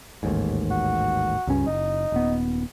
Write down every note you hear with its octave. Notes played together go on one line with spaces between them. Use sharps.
A1 D#2 G#2
F#4
C#2 G2 C#4
F#1 D#4
D#1 B3